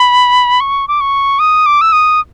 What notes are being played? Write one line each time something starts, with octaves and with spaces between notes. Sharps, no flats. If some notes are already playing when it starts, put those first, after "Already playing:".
Already playing: B5
C#6
D6
C#6
D#6
D6
E6
D#6